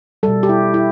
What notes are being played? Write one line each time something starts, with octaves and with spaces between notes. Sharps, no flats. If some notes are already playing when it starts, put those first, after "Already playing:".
B2 G3 A4
G4
E4
E4